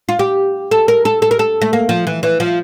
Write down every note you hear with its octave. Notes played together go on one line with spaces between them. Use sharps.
F4
G4
A4
A#4
A4
A4
A#4
A4
A3
A#3
F3
E3
E3
F3